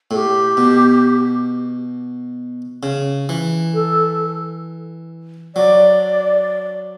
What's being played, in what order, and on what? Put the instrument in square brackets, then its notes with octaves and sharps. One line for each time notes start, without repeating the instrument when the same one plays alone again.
[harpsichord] A2 [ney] A4
[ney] G4
[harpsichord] B2
C#3
E3
[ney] A4
[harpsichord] F#3 [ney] D5